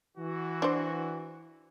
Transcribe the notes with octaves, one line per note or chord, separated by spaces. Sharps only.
E3 F#4
D4 C5